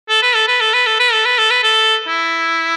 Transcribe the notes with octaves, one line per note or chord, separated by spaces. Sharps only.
A4
B4
A4
B4
A4
B4
A4
B4
A4
B4
A4
B4
A4
E4